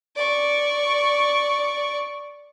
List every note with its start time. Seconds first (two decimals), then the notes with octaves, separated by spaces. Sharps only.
0.16 D5 C#6